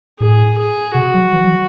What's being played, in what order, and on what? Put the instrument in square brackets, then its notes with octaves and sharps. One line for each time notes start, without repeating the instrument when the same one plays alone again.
[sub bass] A2 [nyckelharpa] G#4
[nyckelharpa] G#4
[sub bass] C3 [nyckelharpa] F#4
[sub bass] F#3
E3
F#3